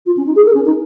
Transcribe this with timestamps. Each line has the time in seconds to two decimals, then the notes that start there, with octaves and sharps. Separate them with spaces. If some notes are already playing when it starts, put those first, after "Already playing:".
0.06 F4
0.17 C#4
0.26 D#4
0.35 G#4
0.46 A#4
0.54 C#4
0.65 D#4